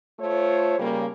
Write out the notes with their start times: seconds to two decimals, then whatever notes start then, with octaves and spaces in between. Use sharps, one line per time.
0.19 A3 F4 C5 C#5
0.79 C#3 G3 A#3